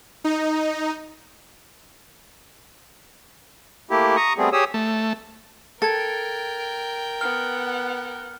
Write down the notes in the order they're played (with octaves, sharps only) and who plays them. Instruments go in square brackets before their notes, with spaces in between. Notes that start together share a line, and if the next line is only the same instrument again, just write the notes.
[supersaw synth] D#4
[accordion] A3 A#3 E4 G4
A#5 C#6 D#6
G3 A3 B3 C4 G#4
G4 G#4 C#5 D#6 E6
[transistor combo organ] A3
[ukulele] A4 [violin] A#4 G5 [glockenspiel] G#6 A6
[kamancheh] B3 F#5 [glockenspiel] F6